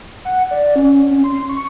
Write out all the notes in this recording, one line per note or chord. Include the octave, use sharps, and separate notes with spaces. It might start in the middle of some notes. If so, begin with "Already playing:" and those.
F#5
D5
C#4
C#4
C6
C#6